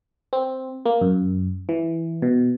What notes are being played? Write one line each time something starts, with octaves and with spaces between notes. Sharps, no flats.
C4
A#3
F#2
E3
B2